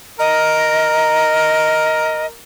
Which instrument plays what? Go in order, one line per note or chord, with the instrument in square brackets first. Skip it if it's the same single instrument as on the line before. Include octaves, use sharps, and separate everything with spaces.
[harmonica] A#4 [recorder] D#5